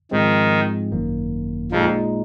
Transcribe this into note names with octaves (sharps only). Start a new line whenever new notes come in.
G#2 D#3 F3 G#3 C4
G#1 F#2 D#3 A#3
F2 A#2 F3 G#3 D#4